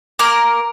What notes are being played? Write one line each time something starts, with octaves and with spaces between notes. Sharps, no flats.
A#3 A#4